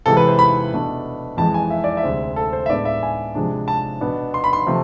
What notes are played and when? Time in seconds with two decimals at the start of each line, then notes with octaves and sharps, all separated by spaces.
0.06 C3 E3 G#3 A4
0.17 B4
0.28 C5
0.39 B5
0.72 B2 A3 D4
1.37 F2 E3 G#3 A5
1.54 G#5
1.70 E5
1.84 D5
1.97 E5
2.03 D2 C3 G#3 C4
2.36 A4
2.53 C5
2.66 E5
2.69 A2 G#3 B3 D4 D5
2.85 E5
3.03 G#5
3.35 C3 F3 G#3 D4
3.68 A5
4.01 B2 B3 D4
4.34 C6
4.44 B5
4.53 C6
4.66 C3 F3 A3